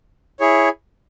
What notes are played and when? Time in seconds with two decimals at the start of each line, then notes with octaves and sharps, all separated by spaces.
0.40 E4 G#4 C#5